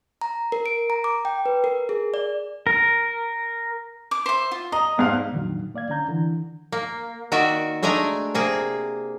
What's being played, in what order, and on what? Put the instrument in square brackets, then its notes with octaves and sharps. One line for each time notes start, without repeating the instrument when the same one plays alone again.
[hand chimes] A#5
A#4
D7
A#5
D6
G5
B4
A#4
G#4
D5
[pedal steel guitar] A#4
[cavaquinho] D6
C5 E5
F4
[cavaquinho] D#5 [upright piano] A#5
[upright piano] F1 G#2 F5
[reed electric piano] F2 A#2 D3 D#3 F#3
A#3 D5 F5 G#6
D3 C#4 A#5 G6
D3 E3
[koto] A#3
D#3 F#4 D5 E5
G#3 A3 D4 G#5 A#5
C3 A#3 G#4